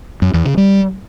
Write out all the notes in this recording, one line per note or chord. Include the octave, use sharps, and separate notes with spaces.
F#2
E2
C#3
G3